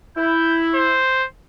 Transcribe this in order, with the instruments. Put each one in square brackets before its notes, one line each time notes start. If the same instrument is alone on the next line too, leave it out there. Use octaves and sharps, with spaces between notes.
[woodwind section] E4 [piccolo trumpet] G6
[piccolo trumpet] C5